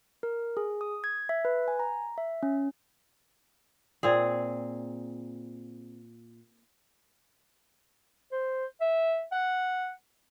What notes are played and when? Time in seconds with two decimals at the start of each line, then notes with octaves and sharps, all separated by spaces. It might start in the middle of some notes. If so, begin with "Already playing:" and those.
0.23 A#4
0.57 G#4
0.81 D#6
1.04 G#6
1.29 E5
1.45 B4
1.68 G#5
1.79 A#5
2.18 E5
2.43 C#4
4.03 A#2 C4 G#4
8.32 C5
8.81 E5
9.32 F#5